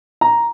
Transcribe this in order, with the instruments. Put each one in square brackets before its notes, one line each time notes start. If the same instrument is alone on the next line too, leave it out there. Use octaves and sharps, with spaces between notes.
[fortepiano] A#5